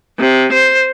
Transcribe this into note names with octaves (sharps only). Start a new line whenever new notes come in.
C3
C5